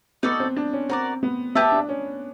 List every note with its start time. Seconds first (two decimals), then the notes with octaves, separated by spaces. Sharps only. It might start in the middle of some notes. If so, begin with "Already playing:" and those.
0.23 B3 D#4 F#4 A4 D5
0.40 C4
0.56 D4
0.73 C#4
0.89 C4 F#4 A#4 D5
1.23 B3
1.55 B3 G4 B4 E5 A5
1.72 D4
1.89 C#4